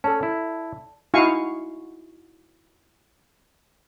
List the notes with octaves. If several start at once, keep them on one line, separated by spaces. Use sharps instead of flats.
C#4 A4 D5 A5
E4
D#4 E4 F#4 F5 G#5 C#6